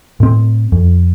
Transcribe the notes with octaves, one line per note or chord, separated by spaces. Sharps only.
A2 C4
F2